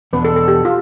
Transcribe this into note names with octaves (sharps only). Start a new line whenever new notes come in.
E2 B2 B3 D4 B4
A4
A4
G4
F4